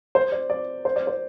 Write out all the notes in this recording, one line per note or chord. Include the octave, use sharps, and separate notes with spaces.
C5
D5
D5
C5
D5
C5